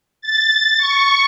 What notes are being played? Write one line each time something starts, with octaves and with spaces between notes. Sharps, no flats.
A6
C#6